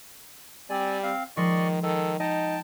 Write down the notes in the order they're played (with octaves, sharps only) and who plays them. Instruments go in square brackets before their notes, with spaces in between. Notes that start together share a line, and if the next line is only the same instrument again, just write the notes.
[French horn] G3 [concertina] C4 D5 G#5
[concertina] C4 F5
[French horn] D#3 [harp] F3 G#3 C7 [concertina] D5 D#5 C#6
[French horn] D#3 [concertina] A4
[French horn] D#4 [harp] D#5 [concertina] G5 A5